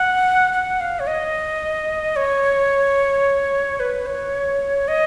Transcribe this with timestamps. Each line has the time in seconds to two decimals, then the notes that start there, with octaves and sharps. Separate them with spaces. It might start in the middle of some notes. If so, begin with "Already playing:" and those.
Already playing: F#5
0.53 F#5
0.80 F5
0.99 C#5
1.07 D#5
2.16 C#5
3.80 B4
4.06 C#5
4.88 D#5